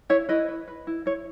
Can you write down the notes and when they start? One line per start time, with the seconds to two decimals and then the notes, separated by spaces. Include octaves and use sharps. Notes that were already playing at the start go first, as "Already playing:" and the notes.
0.09 E4 C#5 E5
0.29 E4 B4 D#5
0.48 B4
0.68 B4
0.87 E4
1.06 E4 C#5